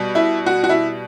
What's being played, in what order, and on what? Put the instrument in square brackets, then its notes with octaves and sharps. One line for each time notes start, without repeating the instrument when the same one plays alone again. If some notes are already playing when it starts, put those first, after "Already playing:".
Already playing: [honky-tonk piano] B2 G3
E4
F#4
F#4
E4